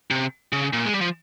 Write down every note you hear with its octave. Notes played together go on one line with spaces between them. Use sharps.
C3
C#3
A#2
G#3
G3
F3